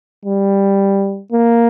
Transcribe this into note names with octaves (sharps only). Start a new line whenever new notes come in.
G3
A#3